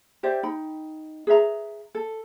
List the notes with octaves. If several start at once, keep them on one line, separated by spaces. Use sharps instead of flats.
G4 C5 D5 E5
D#4 G5 B5
G#4 B4 E5 A#5
A4